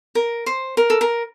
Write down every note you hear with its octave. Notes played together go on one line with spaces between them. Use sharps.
A#4
C5
A#4
A4
A#4